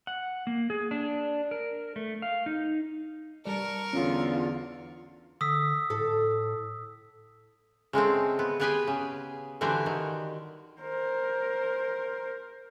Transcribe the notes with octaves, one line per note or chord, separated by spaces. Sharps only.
F#5
A#3
G#4
D4
A#4
A3
F5
D#4
G3 A#4 D5 A5 C#6
E2 D3 C#4 F4 A#5
D3 D#6 E6 B6
A2 A4
C#3 G#3 A3 C4
B3
B3 G4 G#4 B4 G5 G#5
C#3
D3 E3 G3 F#4 G4 C5
D#3
A#4 C5